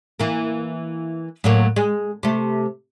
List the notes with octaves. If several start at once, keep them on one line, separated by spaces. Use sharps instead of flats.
E3 A#3
A2 F#3 A#3
G#3
C3 A3